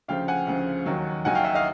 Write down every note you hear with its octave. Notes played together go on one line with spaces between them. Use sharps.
D2 C#3 F3 F5 G5
F#5 G#5
D2 C#3 F3
D#2 D#3 F#3
D#2 D#3 F#3 F#5 G#5
F5 G5
E5 F#5
D#5 F5